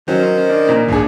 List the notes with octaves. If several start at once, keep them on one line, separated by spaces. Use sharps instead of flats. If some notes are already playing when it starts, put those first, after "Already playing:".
D#3 F#3 C#4 C5
D4
A#2
D#1 C2 G#2 D4 G#4